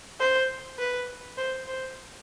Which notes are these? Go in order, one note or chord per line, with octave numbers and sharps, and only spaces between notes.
C5
B4
C5
C5